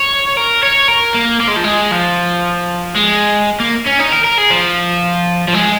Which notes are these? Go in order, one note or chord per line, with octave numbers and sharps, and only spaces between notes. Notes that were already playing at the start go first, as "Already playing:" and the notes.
Already playing: C#5
A#4
C#5
A#4
A#3
A#3
G#3
F3
G#3
F3
G#3
A#3
C#4
D#4
A#4
A#4
G#4
F3
F3
G#3